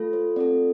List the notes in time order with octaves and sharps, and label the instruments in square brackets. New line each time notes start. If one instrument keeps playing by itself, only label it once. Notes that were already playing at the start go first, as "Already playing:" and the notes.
Already playing: [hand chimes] A3 F4 A4
C5
C4 F4 A4 D5